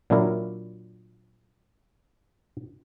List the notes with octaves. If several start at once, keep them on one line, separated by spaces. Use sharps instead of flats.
A#2 F#3 D4 E4 A#4